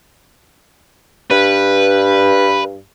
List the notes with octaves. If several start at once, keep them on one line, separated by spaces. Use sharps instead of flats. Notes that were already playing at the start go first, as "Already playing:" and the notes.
G2 B4